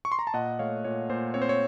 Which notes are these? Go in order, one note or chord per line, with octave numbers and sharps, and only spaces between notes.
C#6
C6
A#5
A5
A#2 D#5 F#5
A3 C#5 F5
A#2 C#5
A#2 C5
C4 C#5
C5
C#5